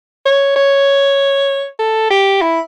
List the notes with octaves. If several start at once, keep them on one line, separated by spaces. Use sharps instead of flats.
C#5
C#5
A4
G4
E4